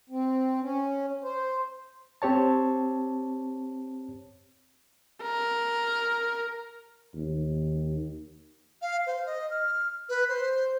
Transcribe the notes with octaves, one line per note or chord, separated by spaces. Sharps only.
C4
C#4
C5
C4 G4 C#5 A5
A#4
D#2
F5
C5
D#5
F6
B4
C5